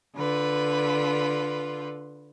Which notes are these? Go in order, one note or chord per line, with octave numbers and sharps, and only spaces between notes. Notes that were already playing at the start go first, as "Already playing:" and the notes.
D3 F4 B4